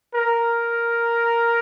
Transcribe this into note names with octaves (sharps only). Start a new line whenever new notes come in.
A#4